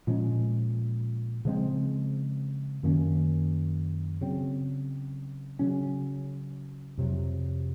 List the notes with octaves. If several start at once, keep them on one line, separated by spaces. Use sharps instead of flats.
A#2 F3 G#3 C#4
C#3 F3 G#3 C4
F#2 D#3 A#3 C#4
C#3 F#3 C4
C#3 F#3 C#4
F2 C3 F#3